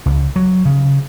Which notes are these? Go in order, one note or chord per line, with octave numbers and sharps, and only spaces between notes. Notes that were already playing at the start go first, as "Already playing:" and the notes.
C#2
F#3
C#3